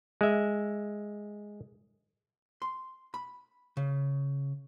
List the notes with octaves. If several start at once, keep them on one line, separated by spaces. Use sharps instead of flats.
G#3 E5
C6
B5
C#3